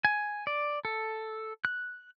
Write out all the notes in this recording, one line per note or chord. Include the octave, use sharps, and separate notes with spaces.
G#5
D5
A4
F#6